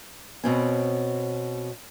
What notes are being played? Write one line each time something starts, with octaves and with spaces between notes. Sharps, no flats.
B2 C4 C#4